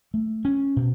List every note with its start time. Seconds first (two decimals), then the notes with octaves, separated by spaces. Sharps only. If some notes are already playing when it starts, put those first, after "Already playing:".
0.14 A3
0.45 C#4
0.76 B2